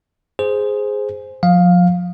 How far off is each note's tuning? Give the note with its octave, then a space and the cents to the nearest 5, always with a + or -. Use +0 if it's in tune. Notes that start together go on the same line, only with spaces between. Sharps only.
G#4 +0 C5 -5
F3 +40 F5 +10